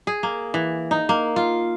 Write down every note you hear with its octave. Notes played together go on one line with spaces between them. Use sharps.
G#4
A#3
E3
D#4
A#3
F4